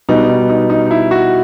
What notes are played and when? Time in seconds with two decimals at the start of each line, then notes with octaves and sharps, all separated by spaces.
0.09 B2 G3 B3 D#4
0.29 D#4
0.50 D#4
0.70 D#4
0.86 D#4
0.91 E4
1.11 F#4